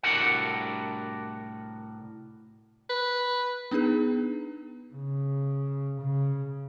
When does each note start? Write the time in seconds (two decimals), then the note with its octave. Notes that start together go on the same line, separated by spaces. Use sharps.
0.03 C2 A2 D4 F#4 A#4 F#5
2.90 B4
3.71 B3 D4 D#4 G#4 B4
4.94 C#3
6.01 C#3